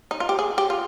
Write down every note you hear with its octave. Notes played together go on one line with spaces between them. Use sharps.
D#4
F4
G4
G#4
G4
F4